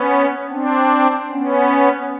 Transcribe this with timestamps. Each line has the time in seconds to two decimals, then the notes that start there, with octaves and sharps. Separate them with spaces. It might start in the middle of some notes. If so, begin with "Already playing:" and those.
Already playing: B3 C#4
0.50 C4 D4
1.31 B3 C#4